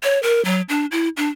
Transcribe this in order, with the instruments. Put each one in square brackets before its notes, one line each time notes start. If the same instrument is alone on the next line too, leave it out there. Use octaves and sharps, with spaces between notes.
[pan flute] C#5
A#4
F#3
D4
E4
D4